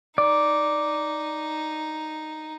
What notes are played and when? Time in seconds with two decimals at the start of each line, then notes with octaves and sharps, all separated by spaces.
0.18 D#4 D5